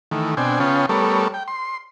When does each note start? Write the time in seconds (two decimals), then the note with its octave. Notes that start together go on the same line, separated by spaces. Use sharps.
0.11 D#3 E3 A3
0.37 B2 C4 D4 G5 G#5
0.60 C#3 B3 C#4 F4 G5 A5
0.89 G3 A3 B3 A4 A#4 C#5
1.34 G5
1.48 C6